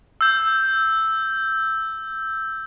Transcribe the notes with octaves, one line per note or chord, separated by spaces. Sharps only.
E6 G6